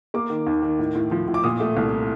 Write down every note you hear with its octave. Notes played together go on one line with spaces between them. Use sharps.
A#3 D6
D#3
D#2
D#3
A2
A2
F3
A2
D6
A#2 D#6
A3
C2